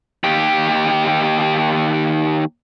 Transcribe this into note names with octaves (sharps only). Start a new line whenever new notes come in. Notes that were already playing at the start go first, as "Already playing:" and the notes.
D#2 G4